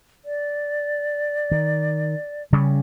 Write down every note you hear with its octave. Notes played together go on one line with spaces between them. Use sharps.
D5
D#3
C#3 G3 C#4